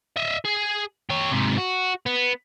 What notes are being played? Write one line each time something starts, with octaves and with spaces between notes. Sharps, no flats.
D#5 E5
G#4
G4 C#5
G#2 C3
F#4
B3